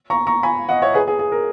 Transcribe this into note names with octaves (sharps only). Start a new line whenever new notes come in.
A#5 C#6
A#5 C#6
G#5 B5
D#5 F#5
C#5 E5
G#4 B4
G#4
G#4
A#4